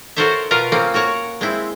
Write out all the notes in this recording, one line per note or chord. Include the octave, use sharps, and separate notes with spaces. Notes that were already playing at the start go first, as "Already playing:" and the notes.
F#4 A4 A#4 C5 C#5 E5
B2 F4 A#4 B4
A#3 C4 C#4
F#4 A#4 C#5 F#5
G#3 C4 E4